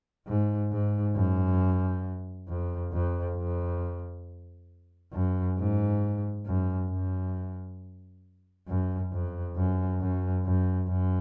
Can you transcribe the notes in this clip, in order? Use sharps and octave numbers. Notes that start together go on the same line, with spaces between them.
G#2
G#2
F#2
F2
F2
F2
F#2
G#2
F#2
F#2
F#2
F2
F#2
F#2
F#2
F#2